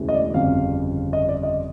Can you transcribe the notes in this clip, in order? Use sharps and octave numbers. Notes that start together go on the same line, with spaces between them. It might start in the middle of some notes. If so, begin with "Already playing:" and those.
Already playing: E1 D2 C#3 E3
D#5
D5
G1 F2 C#3 F5
D#5
D5
D#5